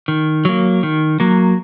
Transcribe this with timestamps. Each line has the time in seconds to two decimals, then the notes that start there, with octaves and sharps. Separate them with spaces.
0.08 D#3
0.45 F#3 A#3
0.83 D#3
1.20 F#3 A#3